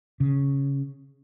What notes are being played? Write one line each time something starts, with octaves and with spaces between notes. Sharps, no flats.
C#3